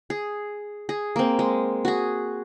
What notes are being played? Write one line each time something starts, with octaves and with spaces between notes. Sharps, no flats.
G#4
G#4
A#3 C4
G#3
F#4 G#4